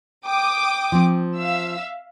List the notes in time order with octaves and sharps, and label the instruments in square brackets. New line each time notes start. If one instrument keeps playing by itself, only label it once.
[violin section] G5 D6 D#6
[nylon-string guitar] F3 C4
[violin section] E5 F5 E6